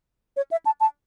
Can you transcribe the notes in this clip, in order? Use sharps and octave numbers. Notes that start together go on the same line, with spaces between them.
C#5
E5
A5
A5